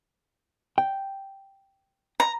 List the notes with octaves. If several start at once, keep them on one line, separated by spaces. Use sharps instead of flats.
G5
A#5